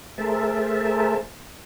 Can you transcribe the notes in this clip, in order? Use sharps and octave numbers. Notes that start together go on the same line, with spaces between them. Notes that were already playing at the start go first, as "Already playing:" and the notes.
A3 G#4 A#4 C5 E5 A5